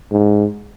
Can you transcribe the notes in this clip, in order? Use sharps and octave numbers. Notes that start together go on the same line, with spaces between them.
G#2